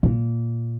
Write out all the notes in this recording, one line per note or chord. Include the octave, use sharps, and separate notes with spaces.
A#2